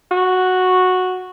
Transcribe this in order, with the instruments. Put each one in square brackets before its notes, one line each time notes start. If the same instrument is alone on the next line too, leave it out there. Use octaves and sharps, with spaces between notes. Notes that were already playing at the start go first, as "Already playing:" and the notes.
[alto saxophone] F#4